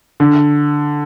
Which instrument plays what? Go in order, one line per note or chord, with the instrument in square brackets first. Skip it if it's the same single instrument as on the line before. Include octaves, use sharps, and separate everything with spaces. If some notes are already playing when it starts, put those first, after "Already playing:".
[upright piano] D3